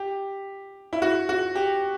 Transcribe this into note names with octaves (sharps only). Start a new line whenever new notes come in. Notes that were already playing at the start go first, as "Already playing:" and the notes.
Already playing: G4
E4
F#4
F#4
G4